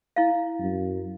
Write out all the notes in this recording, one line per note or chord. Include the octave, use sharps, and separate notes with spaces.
E4 F5
F#2